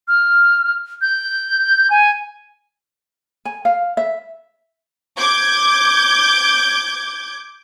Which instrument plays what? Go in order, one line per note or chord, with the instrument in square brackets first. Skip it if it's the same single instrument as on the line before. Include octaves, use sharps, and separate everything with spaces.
[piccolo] F6
G6
G#5
[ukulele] G#5
F5
E5
[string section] D6 G6 G#6